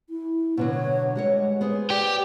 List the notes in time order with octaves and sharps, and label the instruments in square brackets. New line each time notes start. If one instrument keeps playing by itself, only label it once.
[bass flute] E4
[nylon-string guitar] B2 D3 F#3 [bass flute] B3
[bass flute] C#5
[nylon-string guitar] G3 F#4 C#5 [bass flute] G#3
[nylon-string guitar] B3 G#4 C5
[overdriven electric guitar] G4 G5 [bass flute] D5